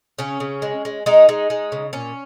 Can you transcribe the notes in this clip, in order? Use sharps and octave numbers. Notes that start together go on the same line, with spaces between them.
C#3 C#4
C#3
G#3
G#3
G#3 D#4
G#3
G#3
C#3
A#2 C#4